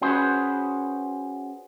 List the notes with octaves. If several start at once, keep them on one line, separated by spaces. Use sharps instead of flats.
C#4 F#4 G#4 B4 C5